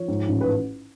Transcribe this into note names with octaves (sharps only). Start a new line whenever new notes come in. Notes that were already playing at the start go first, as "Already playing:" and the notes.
Already playing: F3 C#5
G#2
A1
B4